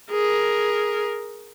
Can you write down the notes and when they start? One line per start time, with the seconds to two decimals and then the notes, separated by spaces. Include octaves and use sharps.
0.11 G#4 A#4